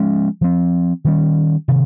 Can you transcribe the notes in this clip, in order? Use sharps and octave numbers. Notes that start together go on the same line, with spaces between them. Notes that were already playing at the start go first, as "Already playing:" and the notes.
Already playing: F3 G#3 C#4
F3 C4
D#3 G3 C#4
C3 D#3